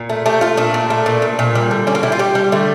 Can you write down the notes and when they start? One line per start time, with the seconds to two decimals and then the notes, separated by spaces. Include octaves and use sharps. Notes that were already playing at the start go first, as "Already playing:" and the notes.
Already playing: A#2
0.09 A3
0.26 A3 G4
0.41 A3 F4
0.57 A#2 D4
0.74 A#2
0.90 A3
1.06 A#2
1.22 A#2
1.39 A#2
1.55 G3
1.71 D3
1.87 G3 C#4
1.95 A#3
2.03 G3 E4
2.12 F4
2.19 G3 G4
2.35 G3
2.52 D3 A3